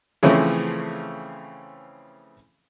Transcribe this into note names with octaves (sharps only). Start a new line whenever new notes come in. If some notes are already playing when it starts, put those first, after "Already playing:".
C#3 E3 F3 A3 C4 C#4